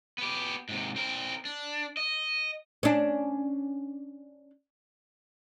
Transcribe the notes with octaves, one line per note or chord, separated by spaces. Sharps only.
B3 G4
G#2 C3
C4 A#4
D4
D#5
C#4 D4